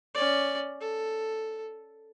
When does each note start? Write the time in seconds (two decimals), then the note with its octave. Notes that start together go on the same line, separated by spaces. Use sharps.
0.15 C#4 D5
0.81 A4